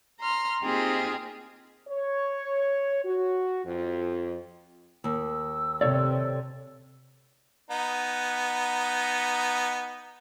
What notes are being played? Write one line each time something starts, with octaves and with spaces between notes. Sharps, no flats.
A#5 C6 F6
A#3 C4 D#4 F4 G4 G#4
C#5
F#4
F2
D#2 E6
C3 A4 C#5 D5
B3 D#4